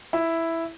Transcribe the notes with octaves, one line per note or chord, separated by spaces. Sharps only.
E4